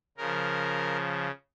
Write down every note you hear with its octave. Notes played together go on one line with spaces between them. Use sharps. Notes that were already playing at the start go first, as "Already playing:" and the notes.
C#3 F3 A#4